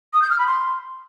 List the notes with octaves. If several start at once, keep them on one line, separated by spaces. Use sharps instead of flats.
D#6
G6
F6
B5
C6